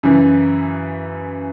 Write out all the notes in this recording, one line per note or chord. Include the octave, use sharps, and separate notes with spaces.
F#2 C#3 E3